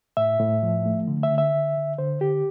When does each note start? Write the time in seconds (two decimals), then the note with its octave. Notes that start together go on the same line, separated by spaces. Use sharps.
0.17 A2 E5
0.40 A2
0.63 F3
0.86 A3
1.07 D3
1.23 E5
1.30 D3
1.38 E5
1.54 D3
1.77 D3
1.98 D3 C5
2.21 D3 G4